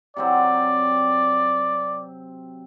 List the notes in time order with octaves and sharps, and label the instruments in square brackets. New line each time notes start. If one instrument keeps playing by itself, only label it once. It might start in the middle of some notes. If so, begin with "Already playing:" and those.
[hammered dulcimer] C3 F#3 C4 [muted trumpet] D5